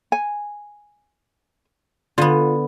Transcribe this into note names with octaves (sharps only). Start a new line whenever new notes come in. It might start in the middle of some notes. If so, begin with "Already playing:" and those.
G#5
D3 B3 F4